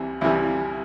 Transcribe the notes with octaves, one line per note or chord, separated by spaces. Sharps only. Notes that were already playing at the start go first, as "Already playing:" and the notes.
Already playing: C2 C3 E3 G3
C2 C3 E3 G3 E4